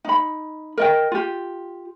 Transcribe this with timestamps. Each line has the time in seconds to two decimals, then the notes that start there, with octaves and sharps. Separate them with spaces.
0.05 D#4 B5
0.77 A#4 D#5 G5
1.12 F4 G4